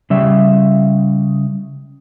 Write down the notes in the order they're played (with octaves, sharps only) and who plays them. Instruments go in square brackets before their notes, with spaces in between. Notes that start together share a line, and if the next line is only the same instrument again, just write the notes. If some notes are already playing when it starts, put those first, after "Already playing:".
[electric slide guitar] C#3 G3 E5